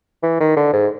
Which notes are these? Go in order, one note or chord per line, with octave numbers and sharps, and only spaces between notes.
E3
D#3
D3
G#2